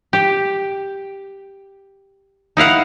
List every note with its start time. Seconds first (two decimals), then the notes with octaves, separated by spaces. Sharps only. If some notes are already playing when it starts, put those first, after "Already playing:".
0.13 G4
2.57 D#4 E4 F5 F#5